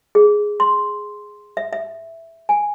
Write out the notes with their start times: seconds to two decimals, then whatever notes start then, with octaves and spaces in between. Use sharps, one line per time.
0.15 G#4
0.60 C6
1.57 E5
1.73 E5
2.49 G#5